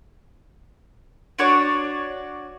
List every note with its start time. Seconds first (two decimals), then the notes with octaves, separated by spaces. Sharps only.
1.39 D4 F#4 C#5 D5